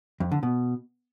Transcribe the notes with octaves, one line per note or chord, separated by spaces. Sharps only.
F2
D3
B2